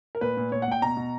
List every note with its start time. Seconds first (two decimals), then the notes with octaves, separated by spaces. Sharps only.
0.15 A#4
0.21 A#2 B4
0.37 A#2
0.52 A#2 C#5
0.62 F#5
0.68 A#2 G5
0.82 B2 A#5
0.97 B2